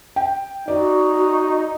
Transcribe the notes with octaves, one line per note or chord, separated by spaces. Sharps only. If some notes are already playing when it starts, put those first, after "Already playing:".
G5
D#4 F#4 D5